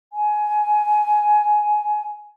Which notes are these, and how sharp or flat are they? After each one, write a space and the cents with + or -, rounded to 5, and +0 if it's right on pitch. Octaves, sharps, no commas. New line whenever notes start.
G#5 +15